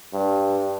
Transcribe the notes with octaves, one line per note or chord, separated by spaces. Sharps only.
G2